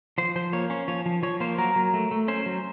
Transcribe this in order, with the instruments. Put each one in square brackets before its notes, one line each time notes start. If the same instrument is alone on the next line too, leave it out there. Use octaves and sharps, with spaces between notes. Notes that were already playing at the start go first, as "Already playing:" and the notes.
[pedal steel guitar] F3 C5
F3 C5
A#3 C#5
C#4 C#5
F3 C#5
F3
F3 C#5
A#3 C5
F#3 A#4
F#3
A3
A3
C#4 C5
F#3